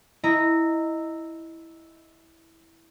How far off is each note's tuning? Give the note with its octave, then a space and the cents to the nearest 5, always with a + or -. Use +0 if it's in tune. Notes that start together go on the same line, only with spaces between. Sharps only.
E4 -5 D#5 +0 A#5 -15